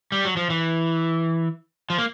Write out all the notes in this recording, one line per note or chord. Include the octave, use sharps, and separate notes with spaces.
G3
F#3
F3
E3
F3
A#3